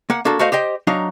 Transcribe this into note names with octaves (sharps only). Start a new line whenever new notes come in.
A#3 F#5
A#3 D4 F#4 A4
A3 F#4 C5 D#5 F5
G4 C5 D#5 G5
F#3 D4 D#4 F5